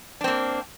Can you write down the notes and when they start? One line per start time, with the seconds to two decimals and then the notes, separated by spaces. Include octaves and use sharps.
0.21 D4
0.24 C4
0.28 A#3